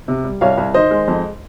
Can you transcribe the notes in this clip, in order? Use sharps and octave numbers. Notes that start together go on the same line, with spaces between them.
C3
G3
C2 C#5 F5
C2
D#3 C5 D#5
G#3
F2